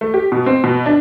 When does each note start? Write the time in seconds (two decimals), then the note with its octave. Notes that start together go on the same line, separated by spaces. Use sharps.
0.01 A3
0.14 G4
0.32 B2
0.46 C4
0.64 B2
0.86 D4